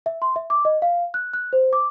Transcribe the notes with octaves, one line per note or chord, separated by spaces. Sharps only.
E5
C6
E5
D6
D#5
F5
F#6
F#6
C5
D6